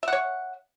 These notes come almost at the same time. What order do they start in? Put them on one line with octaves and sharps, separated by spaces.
E5 F#5 C#5